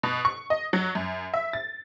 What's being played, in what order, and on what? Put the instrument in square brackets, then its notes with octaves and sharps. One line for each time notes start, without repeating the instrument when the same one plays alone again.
[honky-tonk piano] B2
C#6
D#5
F#3
F#2
E5
A6